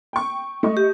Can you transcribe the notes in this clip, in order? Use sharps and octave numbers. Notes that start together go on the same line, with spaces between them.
G5 C#6
A3 D#5 C#6
G4